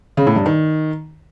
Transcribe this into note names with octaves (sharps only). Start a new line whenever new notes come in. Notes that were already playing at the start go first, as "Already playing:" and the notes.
C#3
A2
G2
D#3